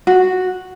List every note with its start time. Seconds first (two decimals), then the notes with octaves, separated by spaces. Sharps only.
0.07 F#4